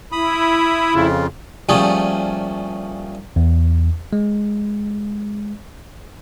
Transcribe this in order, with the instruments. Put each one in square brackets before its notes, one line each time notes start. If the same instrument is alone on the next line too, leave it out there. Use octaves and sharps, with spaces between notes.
[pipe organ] E4 [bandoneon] B5 D#6
[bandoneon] F2 C#3 F4
[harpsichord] A#2 F3 G3 A3 C#4 G#4
[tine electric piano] E2
G#3